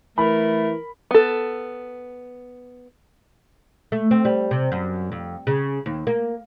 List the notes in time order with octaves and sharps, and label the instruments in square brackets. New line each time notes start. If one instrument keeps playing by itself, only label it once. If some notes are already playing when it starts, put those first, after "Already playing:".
[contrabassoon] E3 [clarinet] A3 [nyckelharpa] A#4 [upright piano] B5
[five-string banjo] B3 A4
[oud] A3
C4
G3
C3
F#2
F2
C#3
D#2
A#3